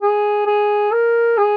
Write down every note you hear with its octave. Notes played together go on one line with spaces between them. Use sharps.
G#4
G#4
A#4
G#4